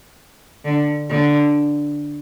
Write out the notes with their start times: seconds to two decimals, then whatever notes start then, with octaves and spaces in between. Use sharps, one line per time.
0.65 D3
1.10 D3